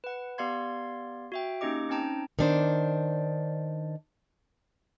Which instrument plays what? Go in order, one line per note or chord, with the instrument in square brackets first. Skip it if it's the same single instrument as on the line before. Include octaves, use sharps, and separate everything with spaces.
[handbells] B4 F#5
B3 G4 D5 F5 C6 G#6
F#4 E5 G5
A#3 C#4 D#4 G4 D#5 D6
C4 C#4 D#4 G5 A5 A#5
[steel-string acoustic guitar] D#3 D4 C5